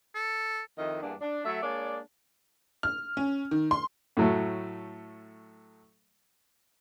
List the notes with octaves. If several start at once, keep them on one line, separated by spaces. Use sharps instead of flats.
A4
F2 D#3 E4 D#5
E2 G2 A#3 D4
D4
F#3 A3 A4 E5
G#3 A#3 D4 C#5 D5
F6
C#4
D#3
C6
A2 F#3 A3